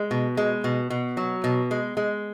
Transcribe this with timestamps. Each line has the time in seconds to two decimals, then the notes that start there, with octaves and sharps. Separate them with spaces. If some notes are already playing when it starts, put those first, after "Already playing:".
Already playing: G#3
0.11 B2
0.37 G#3
0.64 B2
0.90 B2
1.17 F#3
1.44 B2
1.71 G#3
1.97 G#3